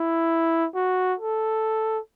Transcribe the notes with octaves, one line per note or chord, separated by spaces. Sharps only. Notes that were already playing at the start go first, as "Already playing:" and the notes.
Already playing: E4
F#4
A4